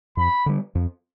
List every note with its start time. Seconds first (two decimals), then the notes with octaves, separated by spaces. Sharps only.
0.17 F2 B5
0.46 D3 G3
0.75 F2